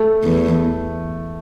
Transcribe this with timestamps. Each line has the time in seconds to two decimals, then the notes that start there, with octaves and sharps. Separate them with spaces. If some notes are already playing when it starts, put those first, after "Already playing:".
Already playing: A3
0.24 E2